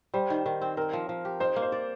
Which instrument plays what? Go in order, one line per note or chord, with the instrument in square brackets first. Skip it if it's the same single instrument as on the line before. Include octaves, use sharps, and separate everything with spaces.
[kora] G3 [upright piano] C5
[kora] D#3
D#3
C4
[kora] C4 [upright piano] A#4
[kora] F3
F3
G4
[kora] D#4 [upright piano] C5
[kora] A#3
[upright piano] C5
[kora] D5